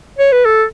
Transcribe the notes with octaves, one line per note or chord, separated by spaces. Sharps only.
C#5
B4
A4